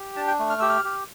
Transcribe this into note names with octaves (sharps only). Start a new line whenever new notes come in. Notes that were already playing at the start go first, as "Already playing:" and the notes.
Already playing: G4
D4 A5
G5
A3
F6
G4 E6
F6
G4